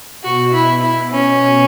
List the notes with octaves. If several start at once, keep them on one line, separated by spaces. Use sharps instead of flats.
B2 F#4
E4
E4
C#4